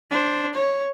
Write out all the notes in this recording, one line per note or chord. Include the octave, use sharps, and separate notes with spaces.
D4 C5
C#5